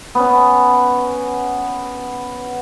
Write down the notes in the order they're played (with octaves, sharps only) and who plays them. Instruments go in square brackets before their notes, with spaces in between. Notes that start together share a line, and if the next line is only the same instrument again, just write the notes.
[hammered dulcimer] B3 C#4